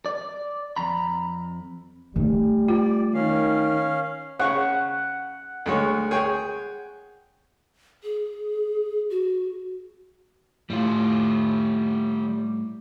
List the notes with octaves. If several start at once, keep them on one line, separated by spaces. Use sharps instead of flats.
D5
F2 A#5 B5
G3 A3 D#4
F4 D5
D#3 C#4 F5
C#3 F#5 C#6
D2 G#3 C#5
G#4 C#5 G5
G#4
F#4
A2 G3 F4